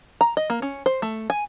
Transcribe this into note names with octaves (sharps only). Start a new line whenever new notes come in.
A#5
D#5
A#3
C#4
C5
A3
G#5